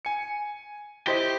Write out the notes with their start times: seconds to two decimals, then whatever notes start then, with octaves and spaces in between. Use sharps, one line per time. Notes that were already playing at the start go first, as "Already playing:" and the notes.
0.05 G#5 C#7
1.07 E4 G4 C5 D#5